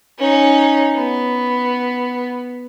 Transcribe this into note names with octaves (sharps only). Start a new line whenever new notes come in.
C#4 D#4
B3